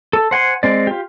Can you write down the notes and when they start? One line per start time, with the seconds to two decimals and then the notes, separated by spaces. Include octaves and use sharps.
0.13 A4
0.31 C5 F#5 G#5 C6
0.63 G#3 C4 D5
0.87 F4 G4